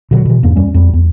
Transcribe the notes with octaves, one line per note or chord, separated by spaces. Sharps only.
B2 D3 F#3
B2 E3
E2 G2 A#3
F#2 G3 C#4
F2 G3
E2